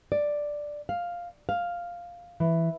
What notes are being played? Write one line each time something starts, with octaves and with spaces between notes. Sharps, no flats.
D5
F5
F5
E3